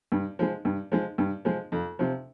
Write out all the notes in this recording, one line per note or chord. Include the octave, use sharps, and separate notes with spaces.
G2
F3 G#3
G2
F3 G#3
G2
F3 G#3
F2
C3 F3